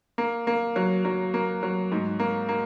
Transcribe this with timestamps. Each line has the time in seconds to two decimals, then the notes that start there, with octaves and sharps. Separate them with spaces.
0.18 A#3
0.47 A#3
0.76 F#3
1.05 F#3
1.34 A#3
1.63 F#3
1.92 G#2
2.19 A#3
2.49 A#3